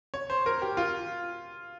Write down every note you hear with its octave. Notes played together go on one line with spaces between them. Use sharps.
C#5
C5
A#4
G4
F4